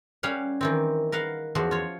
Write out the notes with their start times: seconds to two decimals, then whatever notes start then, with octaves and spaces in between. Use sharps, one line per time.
0.23 G3 C#4 F5 F#5
0.61 D#3 E3 C4
1.12 A#4 B4 F5 F#5
1.55 E2 F3 F#4 C6
1.71 F4 C#5